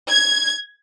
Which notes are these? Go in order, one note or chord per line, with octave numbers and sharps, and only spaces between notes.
G#6